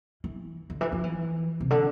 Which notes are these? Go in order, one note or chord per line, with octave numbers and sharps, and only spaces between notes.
E3
D3
E3
F3
E3
C3
D3